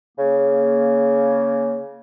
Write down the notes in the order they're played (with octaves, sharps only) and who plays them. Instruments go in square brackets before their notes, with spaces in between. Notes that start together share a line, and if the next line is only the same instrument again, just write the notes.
[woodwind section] C#3 A#3